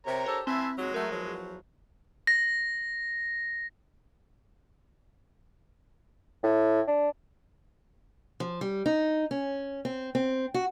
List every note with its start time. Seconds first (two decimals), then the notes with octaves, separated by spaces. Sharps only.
0.06 C3 A#4 C#5 A#5
0.26 D4 G4 A4 C5
0.47 C4 E4 B4 E5 G#5 A5 C6
0.78 D#2 F#3 G#3
0.94 F#3 A3 A#4
1.12 E2 F3 F#3
2.27 A#6
6.43 A2
6.88 D4
8.40 F3
8.61 G3
8.86 D#4
9.31 C#4
9.85 C4
10.15 C4
10.54 F#4